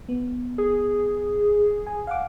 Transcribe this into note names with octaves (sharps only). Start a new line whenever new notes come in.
B3
G#4
G#5
F5 F#5 D6